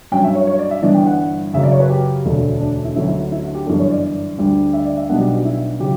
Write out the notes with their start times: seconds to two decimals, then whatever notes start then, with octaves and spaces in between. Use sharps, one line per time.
0.11 G2 F#3 C#4 G5
0.24 E5
0.35 C#5
0.47 C#5
0.59 D5
0.71 E5
0.82 G1 G2 E3 B3 D4 D5
0.94 G5
1.06 F#5
1.53 F#2 C#3 F#3 E5
1.63 D5
1.72 C#5
1.80 B4
1.89 G4
2.25 E1 D2 D3 A3 D4
2.60 D4
2.84 E4
2.96 D2 D3 F#3 C#4 E4
3.07 E4
3.20 E4
3.32 E4
3.44 F#4
3.55 G4
3.66 G1 F#2 E3 B3 D4 A4
3.78 C#5
3.91 D5
4.03 D5
4.38 D2 D3 G3
4.73 E5
4.85 D5
4.97 E5
5.09 B1 B2 G3 B3 D4 F#5
5.20 G4
5.33 F#4
5.45 E4
5.80 C#3 F#3 G4